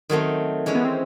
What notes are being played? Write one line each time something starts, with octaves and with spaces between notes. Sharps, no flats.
D#3 F#3 A3 C4
E3 G#3 C#4
B3
C4